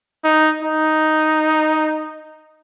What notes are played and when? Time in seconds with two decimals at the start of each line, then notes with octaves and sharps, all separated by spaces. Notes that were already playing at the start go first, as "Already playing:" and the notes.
0.24 D#4
0.62 D#4